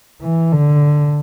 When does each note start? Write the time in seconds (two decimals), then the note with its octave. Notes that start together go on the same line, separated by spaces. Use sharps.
0.22 E3
0.52 D3